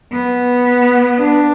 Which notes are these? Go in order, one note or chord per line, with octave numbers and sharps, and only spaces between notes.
B3
D4